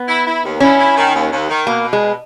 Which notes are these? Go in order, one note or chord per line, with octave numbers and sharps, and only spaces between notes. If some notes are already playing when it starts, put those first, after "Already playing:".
Already playing: B3
E4
E4
D#2
C#4 E4
E4
D#3
D#2
D#2
D#3
B2 A#3
B2
G#3